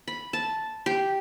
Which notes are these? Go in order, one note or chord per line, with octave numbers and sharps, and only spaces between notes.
B5
A5
G4